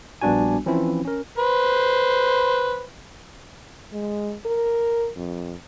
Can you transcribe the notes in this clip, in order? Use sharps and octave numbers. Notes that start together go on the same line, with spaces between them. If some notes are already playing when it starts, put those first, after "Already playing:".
A#1 G3 B3 D4 F#4 G#5
E3 F3 C4 C#4 E4
C#4 A#4
B4 C5
G#3
A#4
F2